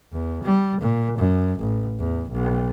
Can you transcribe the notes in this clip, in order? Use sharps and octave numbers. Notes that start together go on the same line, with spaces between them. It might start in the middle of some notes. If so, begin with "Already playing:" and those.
E2
G3
A#2
F#2
A1
E2
B1